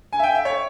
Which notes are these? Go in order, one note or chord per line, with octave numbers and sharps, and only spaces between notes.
G#5
E5
G5
E5
C#5